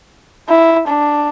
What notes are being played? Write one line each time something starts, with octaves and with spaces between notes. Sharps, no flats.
E4
D4